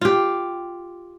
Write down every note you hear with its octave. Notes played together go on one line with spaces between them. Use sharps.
F4 G4